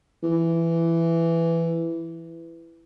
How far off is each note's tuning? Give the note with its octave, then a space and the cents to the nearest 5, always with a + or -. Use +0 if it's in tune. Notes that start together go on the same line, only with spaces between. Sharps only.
E3 +10